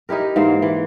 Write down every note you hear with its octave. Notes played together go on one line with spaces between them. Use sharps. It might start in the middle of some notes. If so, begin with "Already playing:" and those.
D#4 E4 G4 A#4
G#2 E3 A#3 C5
E3